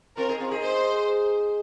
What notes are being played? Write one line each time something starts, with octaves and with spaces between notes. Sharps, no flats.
C4 F4 A#4
D#4 G#4
C4 F4
D#4 G#4
C5